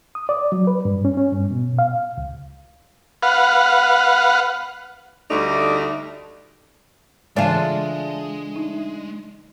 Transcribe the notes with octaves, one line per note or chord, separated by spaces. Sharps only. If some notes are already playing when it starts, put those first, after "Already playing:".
D#6
D5
F#3
B4
G2
C#4
C#4
G2
B2
F5
C#2
B4 F5 F#5
D2 G3 A3 D#4 D5
C#3 E3 G#3 A3 D4 F4 G#5 A5
D#4